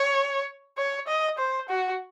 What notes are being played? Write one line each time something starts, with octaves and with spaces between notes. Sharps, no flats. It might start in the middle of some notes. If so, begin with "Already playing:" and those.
Already playing: C#5
C#5
D#5
C5
F#4